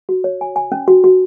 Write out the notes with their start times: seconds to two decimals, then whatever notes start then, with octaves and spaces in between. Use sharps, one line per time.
0.09 F#4
0.24 C#5
0.41 G#5
0.56 G#5
0.72 C#4
0.88 F#4
1.04 F#4